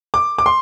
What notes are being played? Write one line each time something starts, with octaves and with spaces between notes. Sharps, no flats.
D6
D6
C6